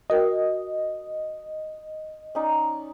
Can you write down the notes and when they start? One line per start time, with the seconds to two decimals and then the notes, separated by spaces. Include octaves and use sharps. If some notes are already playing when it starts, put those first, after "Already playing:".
0.10 F#4 A#4 D#5 G5
2.35 C#4 D#4 D5